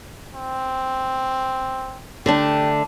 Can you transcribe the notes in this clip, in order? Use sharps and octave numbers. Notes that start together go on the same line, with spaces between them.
C4
D3 A3 D4 G4